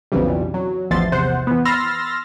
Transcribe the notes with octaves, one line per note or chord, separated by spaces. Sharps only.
B1 F2 C#3 E3 G3
F#3
A1 E2 F3 E5 C6 A6
E2 C3 C5 F#5
E3 B3
B5 C6 E6 F6 A6 A#6